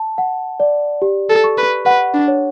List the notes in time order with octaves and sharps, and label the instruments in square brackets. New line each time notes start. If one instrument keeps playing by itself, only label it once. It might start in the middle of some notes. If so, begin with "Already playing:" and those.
Already playing: [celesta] A5
F#5
D5
G4
[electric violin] A4
[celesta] C#6
[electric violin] B4
[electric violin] B4 [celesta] F#5
[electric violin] D4
[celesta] C#5